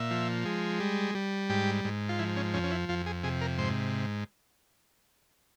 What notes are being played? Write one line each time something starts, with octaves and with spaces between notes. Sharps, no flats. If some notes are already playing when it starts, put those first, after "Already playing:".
Already playing: A#2 E5
F3
G#3
G3
G3
G#2 G4
G#2
F4
F3 E4
C#4
F2 C#4
C#4
E4
F2 F4
G#4
C3 G#4
A#4
G#2 C5